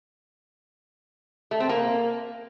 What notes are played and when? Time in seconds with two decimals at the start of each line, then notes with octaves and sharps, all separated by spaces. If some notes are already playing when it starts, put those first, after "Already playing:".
1.51 A3
1.60 C4
1.69 A#3